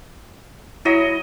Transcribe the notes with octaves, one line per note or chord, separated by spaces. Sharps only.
F#3 E4 D#5